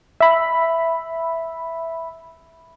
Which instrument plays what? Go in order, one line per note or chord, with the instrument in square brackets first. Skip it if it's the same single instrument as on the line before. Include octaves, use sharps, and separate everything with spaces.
[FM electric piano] E5 B5